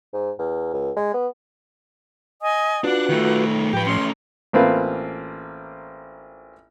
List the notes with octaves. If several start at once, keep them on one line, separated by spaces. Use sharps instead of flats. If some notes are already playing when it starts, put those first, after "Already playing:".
G#2
E2
C#2
G#3
B3
D#5 G#5 D#6
D4 F4 F#4 B4 F#5
D#3 A3
A2 F3 G4 B4 G5
A3 C#4 C6
A1 A#3 C4 F4 B4 F5